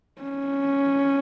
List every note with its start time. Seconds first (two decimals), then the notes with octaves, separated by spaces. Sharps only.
0.22 C#4